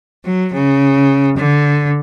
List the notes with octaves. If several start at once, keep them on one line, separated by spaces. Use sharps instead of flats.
F#3
C#3
D3